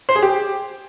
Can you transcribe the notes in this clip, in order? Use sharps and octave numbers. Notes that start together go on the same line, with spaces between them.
C5
G#4
G4